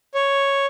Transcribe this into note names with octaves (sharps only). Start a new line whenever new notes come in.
C#5